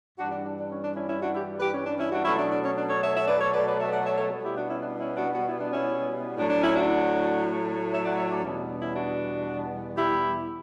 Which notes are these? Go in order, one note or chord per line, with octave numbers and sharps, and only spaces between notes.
G2 E3 G3 D4 F#4
D4
D4
D4
C#4
D4
C#4 E4
C#4 E4
D4 F#4
E4 G4
G4 B4
C#4
D4
C#4 E4
D4 F#4
B2 F#3 A3 C#4 E4
D4
D4
C#4
D4
A4 C#5
C#5 E5
C#5 E5
B4 D5
A4 C#5
B4 D5
B4 D5
C#5 E5
D5 F#5
C#5 E5
A4 C#5
B2 G3 B3
E4 G4
D4 F#4
C#4 E4
D4
C#4 E4
D4 F#4
F#4
E4
D4
C#4 E4
A2 F#3 A3 D4
D4
C#4 E4
D4 F#4
C#5 E5
D5 F#5
C#5 E5
D4 F#4
E2 B2 G3 B3 C#4 E4
D4
D4
C#4 E4
D4 F#4
E4 G4